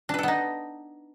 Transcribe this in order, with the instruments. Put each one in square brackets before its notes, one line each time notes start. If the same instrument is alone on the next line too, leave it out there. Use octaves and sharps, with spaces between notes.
[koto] D4
B4
A4
B3
D#4